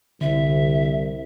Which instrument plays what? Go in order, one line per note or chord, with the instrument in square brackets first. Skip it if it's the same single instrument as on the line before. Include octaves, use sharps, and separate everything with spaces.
[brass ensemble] C2 [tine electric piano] D3 [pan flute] E5